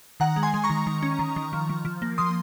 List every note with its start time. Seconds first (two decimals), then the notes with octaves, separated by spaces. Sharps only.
0.20 D#3 F#5 A#5
0.36 G#3
0.43 G#5 C6
0.54 G#3
0.64 A#5 C#6
0.70 D#3
0.87 D#3
1.02 C#4
1.19 D#3
1.36 D#3
1.53 F3
1.69 F3
1.85 F3
2.02 A#3
2.18 F3 C6 D#6